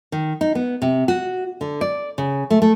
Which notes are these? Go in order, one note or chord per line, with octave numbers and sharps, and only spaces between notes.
D#3
D#4
B3
C3
F#4
D3
D5
C#3
A3
A3